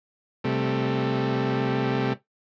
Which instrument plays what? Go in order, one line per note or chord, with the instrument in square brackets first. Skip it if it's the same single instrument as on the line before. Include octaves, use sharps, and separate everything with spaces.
[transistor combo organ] C3 G3 A3